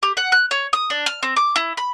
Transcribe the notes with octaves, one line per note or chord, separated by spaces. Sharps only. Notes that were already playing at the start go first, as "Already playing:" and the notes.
G4
F#5
F#6
C#5
D#6
D4
F6
C4
D6
E4
B5